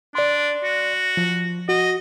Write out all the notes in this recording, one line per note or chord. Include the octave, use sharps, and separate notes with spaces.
D4 D5 C6
F#4
F3
F#4 D#5